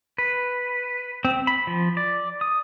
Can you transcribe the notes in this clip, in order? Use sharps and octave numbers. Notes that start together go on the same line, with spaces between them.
B4
C4
B5
F3
D5
D#6